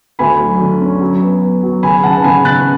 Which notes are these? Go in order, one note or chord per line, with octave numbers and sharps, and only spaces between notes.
D2 G#5 B5
F#3
D3
C#4
F#3
B3
B3
F#3
C#3 G#5 B5
C#3 F#5 A5
A5
C#3 G#5 B5
C#3 F#6 A6